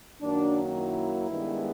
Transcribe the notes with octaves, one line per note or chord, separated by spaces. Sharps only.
F#2 D#3 F#3 A#3 D4
E4
G2 D#3 G#3 B3